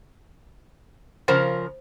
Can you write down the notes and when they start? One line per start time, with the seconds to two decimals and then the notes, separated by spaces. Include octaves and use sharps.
1.28 C#3 F3 A#4 C5